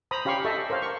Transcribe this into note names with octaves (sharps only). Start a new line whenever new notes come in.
C5 A#5 B5 D#6
C#4 G4 F5 B5 C#6
G4 A4 D#5 E5 A5 C#6
A#4 C5 C#5 F5
C#6